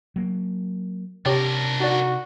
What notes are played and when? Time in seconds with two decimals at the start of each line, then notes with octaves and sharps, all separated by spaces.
0.16 F#3 A#3
1.26 C3 D4 G4 A#4 C#5 G5
1.80 D#4 F#4 D5